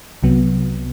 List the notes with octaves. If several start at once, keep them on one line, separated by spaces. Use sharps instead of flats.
C2 C3 F#3 B3